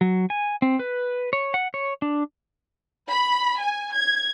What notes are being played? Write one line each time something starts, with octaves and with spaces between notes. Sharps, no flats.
F#3
G#5
C4
B4
C#5
F#5
C#5
D4
B5
G#5
G#6